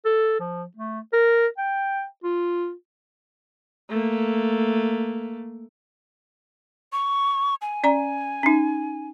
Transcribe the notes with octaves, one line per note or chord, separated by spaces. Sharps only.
A4
F3
A3
A#4
G5
F4
A3 A#3
C#6
G#5
C#4 D5 A#5
C#4 D#4